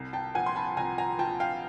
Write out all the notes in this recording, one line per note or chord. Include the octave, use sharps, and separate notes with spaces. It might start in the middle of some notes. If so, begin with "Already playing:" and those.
Already playing: C2
G5 A5
A#2 F3 F#5 G#5
C6
A5 B5
C2 G#5 A#5
G#5 A#5
A#2 F3 G5 A5
F5 G5